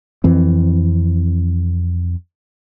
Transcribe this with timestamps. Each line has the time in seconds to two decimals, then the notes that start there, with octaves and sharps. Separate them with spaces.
0.24 F2 E3 C4